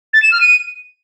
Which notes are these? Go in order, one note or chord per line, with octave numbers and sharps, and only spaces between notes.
A6
E7
F6
D#7